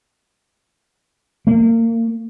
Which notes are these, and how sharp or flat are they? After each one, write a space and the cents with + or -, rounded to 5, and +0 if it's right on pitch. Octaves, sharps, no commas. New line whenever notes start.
A#3 -30